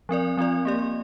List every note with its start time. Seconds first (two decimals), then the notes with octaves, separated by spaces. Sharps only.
0.09 F3 C4 A#4 D5
0.37 F3 C4 F4 D5
0.65 A#3 G4 D5